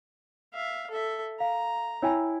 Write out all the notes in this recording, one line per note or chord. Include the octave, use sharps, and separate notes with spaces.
E5 F5
A4 E5
F5 A#5
E4 C#5 G5 G#5